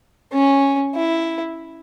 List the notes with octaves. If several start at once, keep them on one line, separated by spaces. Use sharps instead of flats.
C#4
E4